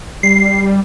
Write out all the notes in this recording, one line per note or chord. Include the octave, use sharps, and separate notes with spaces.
G3 C7